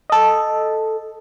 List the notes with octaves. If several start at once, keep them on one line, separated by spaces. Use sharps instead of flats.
A4 D#5